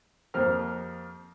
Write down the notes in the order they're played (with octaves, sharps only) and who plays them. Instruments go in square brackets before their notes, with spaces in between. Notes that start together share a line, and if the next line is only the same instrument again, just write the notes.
[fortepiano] F2 F3 A#3 G4 C5 F6